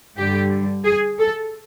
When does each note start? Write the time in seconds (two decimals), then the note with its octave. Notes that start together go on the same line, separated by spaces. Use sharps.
0.16 G2 D3 G3 G4
0.84 G#4
1.19 A4